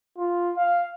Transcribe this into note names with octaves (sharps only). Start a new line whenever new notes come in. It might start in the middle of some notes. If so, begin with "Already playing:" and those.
F4
F5